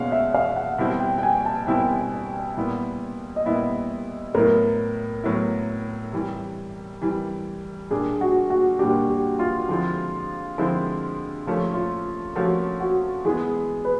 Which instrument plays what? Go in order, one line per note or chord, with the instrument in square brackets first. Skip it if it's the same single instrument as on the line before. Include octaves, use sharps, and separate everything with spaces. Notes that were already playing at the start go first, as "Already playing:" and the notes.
Already playing: [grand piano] B2 G#3 C#4 [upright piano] F5 F#5
[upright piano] E5
F5
F#5
[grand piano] B2 G3 C4 E4
[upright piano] G5
G5
G#5
A5
[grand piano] B2 G3 C4 E4
A#2 G3 B3 E4
[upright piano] D#5
[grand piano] A#2 G3 B3 E4 [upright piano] E5
[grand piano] A2 F#3 B3 E4 [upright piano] A#4
[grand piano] A2 F#3 B3 E4
C3 E3 G3
C3 E3 G3
[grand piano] A#2 G3 A#3 D4 [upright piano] G#4
[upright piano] F#4
F#4
[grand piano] A#2 G3 A#3 D4 [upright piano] G4
[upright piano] G4
F4
[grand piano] D3 F3 G#3 C4 E4
D3 F3 G#3 C4 E4
[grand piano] C3 F3 A3 C#4 [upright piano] F4
[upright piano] F4
[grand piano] C3 F3 A3 C#4 [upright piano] F#4
[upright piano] F#4
[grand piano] E3 G#3 B3 [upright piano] G#4
[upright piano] B4